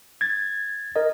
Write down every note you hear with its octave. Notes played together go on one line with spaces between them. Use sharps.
G#6 A6
A#4 D#5